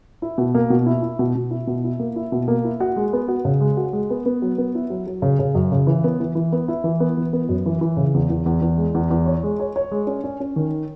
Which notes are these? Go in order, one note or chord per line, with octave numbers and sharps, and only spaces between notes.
E4
B2
A#3
B2
E4
E4
B2
B2
E4
B2
E4
A#3
E4
B2
A#3
E4
F#4
G#3
B3
F#4
C#3
G#3
F#4
G#3
B3
B3
F#3
B3
E4
F#3
F#3
C#3
C#3
F#2
C#3
E3
B3
E3
E3
B3
E4
E3
B3
E3
B3
F#2
E3
E3
C#3
E2
E2
E2
E2
G#3
E2
E2
C#5
G#3
C#5
C#5
G#3
C#4
C#4
C#4
D#3